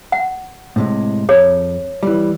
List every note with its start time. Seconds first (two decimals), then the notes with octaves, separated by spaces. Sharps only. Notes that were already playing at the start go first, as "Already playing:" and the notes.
0.12 F#5
0.76 A2 C3 G#3
1.29 F2 G#4 C#5
2.03 E3 G3